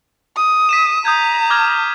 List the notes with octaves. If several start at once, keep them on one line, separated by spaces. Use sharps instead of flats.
D#6
B6 D#7 E7
A#5 D#6 G6 G#6
D6 F6 G#6